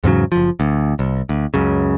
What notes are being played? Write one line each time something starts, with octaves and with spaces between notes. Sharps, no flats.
E2 G#2 C#3 F#3
F#1 F3
D2
C2
D2
C#2 F#2 C#3